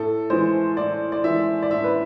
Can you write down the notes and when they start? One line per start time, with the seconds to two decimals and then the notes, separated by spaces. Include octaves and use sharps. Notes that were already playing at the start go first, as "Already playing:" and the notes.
Already playing: A2 A4
0.30 E3 G#3 C5
0.77 A2 D5
1.12 D5
1.24 E3 G#3 E5
1.63 D5
1.71 A2 E5
1.84 B4